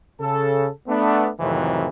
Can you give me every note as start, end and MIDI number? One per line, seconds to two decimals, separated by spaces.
0.20 0.68 49
0.20 0.68 69
0.87 1.29 57
0.87 1.29 59
0.87 1.29 62
1.40 1.89 41
1.40 1.89 45
1.40 1.89 48
1.40 1.89 51
1.40 1.89 52
1.40 1.89 54